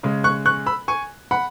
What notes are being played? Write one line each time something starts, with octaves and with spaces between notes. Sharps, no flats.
C#3 G#3
C#6 F#6
C#6 F#6
B5 E6
G#5 C#6
F#5 B5